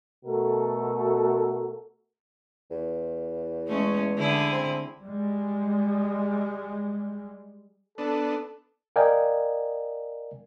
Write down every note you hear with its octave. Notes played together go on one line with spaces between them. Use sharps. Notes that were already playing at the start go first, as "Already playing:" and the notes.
B2 A3 F#4 A4 A#4
E2
G#3 A3 C#4
D3 E4 G#4
C4
G3 G#3
B3 D4 A4
A#4 D5 D#5 F5 G5 G#5